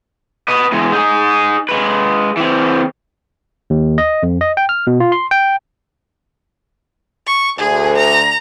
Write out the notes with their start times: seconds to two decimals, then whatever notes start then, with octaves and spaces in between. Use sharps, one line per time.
0.48 B4 D#5
0.72 E2 G#3
0.92 D#4 G#4
1.69 G#3 B4
2.37 E3 C4
3.70 D#2
3.98 D#5
4.23 F2
4.41 D#5
4.57 G5
4.69 F6
4.87 B2
5.00 F4
5.12 C6
5.31 G5
7.27 C#6
7.59 D2 G#4
7.98 A#5